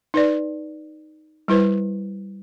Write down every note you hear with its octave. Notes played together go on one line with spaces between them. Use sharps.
D#4 B4 D5
G3 E4 B4 C5